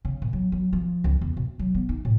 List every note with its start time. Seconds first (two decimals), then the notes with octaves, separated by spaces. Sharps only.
0.05 C#3
0.22 A#2
0.33 F#3
0.52 F#3
0.73 F3
1.04 C#2
1.21 E2
1.37 B2
1.59 F#3
1.75 B3
1.89 D#4
2.05 A2